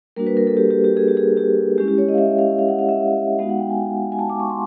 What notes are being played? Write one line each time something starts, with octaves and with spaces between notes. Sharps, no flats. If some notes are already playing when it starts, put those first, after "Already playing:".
G3 A#3 D4 F#4 A#4
B4
A#4
A4
G4
G4
G4
G#4
G4
G#4
G4
G#3 C#4 E4 G4
G4
C#5
D#5
F5
E5
F5
F5
F#5
F5
E5
G#3 B3 D#4 F#4 F5
F#5
G5
G#5
G#5
A5
D6
C#6
C6